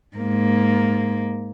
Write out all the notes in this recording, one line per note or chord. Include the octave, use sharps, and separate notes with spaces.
G#2 A#3